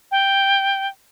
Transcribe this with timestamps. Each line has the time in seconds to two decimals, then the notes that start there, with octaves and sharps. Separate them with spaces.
0.11 G5